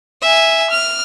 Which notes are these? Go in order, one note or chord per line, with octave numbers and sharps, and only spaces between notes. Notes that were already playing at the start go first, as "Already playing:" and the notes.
E5 G#5
F6